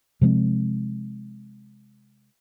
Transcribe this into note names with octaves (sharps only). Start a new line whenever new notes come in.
C3 F3 G#3 C4